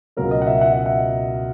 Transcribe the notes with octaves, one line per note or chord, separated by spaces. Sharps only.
C#2 B2 F#3 A#4
D#5
F#5
E5
F#5
E5
F#5